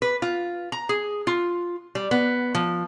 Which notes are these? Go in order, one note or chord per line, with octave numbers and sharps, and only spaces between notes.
B4
F4
A#5
G#4
F4
G3
B3
F3